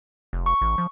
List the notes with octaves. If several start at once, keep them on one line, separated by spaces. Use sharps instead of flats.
F1
C#6
A1
F3